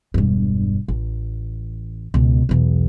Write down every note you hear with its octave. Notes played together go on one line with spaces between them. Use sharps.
E1 G2
A1
C#2 B2
B1 E2